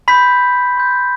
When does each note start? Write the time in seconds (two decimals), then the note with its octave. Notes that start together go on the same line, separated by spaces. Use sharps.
0.08 B5 C6 G6 B6
0.77 C6 G6